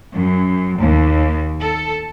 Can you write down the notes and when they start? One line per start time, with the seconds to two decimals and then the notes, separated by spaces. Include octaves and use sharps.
0.14 F#2
0.79 D#2
1.60 A4